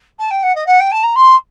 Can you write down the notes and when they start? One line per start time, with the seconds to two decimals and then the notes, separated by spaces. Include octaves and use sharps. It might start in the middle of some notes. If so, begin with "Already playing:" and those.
0.19 A5
0.31 G5
0.43 F#5
0.55 D#5
0.67 F#5
0.80 G5
0.92 A5
1.03 A#5
1.16 C6